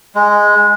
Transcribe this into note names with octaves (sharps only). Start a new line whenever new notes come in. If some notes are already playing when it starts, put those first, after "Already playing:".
G#3